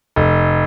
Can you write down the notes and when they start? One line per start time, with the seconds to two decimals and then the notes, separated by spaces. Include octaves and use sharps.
0.16 F1